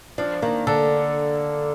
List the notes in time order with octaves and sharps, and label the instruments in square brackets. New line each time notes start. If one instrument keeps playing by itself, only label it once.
[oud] F3 [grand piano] D4
[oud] D#3 [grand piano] A#3
[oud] D3 [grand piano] A4